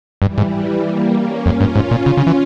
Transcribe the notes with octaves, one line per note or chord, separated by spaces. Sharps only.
G2 E3 G3
G#2
G3 A#3
A#3 C#4
F2 C#4 F4
G2
G#2
A#2
C#3
C#3
E3